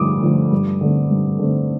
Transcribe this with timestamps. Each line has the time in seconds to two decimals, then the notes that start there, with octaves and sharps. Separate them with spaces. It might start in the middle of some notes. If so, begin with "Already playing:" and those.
Already playing: G2 D3 F3 A3 D6 D#6
0.22 D3 F3 A3
0.52 G2
0.81 D3 A3 C4
1.11 G2
1.39 D3 A3 C4